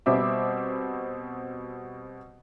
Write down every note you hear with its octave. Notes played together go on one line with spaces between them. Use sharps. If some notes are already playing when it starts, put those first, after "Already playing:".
B2 G3 C4 E5 D6